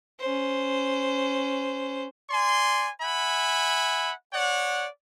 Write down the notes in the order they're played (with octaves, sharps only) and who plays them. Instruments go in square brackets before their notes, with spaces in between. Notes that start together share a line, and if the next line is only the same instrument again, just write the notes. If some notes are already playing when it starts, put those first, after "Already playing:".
[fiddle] C#4 C5
[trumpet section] D5 G#5 C6
E5 F#5 G#5 B5
C#5 D5 F#5